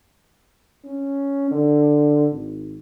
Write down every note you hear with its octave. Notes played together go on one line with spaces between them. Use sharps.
C#4
D3
G#1